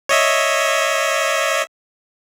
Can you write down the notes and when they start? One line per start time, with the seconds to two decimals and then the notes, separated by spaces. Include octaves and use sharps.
0.09 C#5 D#5 E5